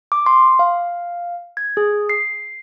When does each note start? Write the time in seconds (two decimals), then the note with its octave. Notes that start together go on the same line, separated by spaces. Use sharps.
0.12 D6
0.26 C6
0.59 F5
1.57 G#6
1.77 G#4
2.09 C7